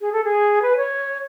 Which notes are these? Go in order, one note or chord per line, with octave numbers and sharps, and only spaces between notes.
G#4
A4
G#4
B4
C#5